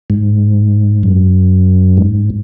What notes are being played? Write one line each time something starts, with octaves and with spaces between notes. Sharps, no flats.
G#2
F#2
G#2